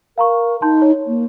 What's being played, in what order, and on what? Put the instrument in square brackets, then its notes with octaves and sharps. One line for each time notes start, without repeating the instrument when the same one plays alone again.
[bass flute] A#4 [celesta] F5 A#5 C#6
[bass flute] D#4 [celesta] A5 C6 G6
[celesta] C#5
[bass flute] A#3